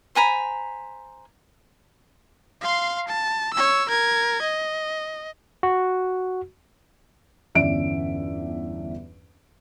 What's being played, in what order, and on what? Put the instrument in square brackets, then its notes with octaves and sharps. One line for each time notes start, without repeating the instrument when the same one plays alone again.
[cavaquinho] C5 G#5 A#5 B5
[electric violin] F5 C6
A5
C#5 E6
A#4 G#6
D#5
[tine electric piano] F#4
[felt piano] G1 E2 C#4 D5 E5 D7